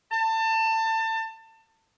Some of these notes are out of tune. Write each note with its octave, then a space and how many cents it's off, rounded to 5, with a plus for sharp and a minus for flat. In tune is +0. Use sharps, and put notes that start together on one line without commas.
A5 +25